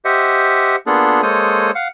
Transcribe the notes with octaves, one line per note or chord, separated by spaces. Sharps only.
G4 C5 D#5 E5 F#5
A#3 B3 D4 F4 G#4 A4
G#3 A#3 A4 C5 C#5 D#6
F5 F#5